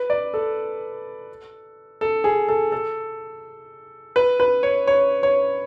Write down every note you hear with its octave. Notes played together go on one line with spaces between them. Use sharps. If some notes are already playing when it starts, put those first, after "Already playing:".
Already playing: B4
D5
A4
A4
G#4
A4
A4
B4
B4
C#5
C#5
C#5